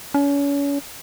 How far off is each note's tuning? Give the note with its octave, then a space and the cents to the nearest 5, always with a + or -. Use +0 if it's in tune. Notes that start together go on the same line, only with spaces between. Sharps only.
C#4 +35